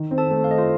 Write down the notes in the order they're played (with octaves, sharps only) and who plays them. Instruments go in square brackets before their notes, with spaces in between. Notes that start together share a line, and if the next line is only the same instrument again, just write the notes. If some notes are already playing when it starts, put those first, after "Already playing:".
Already playing: [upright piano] D#3
C4
[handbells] A4 A5
[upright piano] A3
[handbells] F5
[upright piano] A3 [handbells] D#5
[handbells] F4 F5